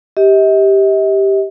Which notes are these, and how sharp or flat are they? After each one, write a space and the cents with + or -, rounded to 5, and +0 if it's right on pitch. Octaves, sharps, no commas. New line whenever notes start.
G4 +0 D#5 +45